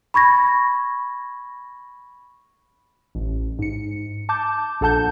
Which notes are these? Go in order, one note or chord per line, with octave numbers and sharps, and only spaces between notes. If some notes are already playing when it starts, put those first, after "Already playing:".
B5 C#6 G#6 A#6
A1
G#2 C#7
A5 D6 G6
A#1 A4 F#5 A5 G6